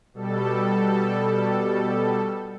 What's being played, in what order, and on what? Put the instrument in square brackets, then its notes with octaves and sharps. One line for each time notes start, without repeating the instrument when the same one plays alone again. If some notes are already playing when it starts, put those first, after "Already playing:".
[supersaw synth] B2 G3 A4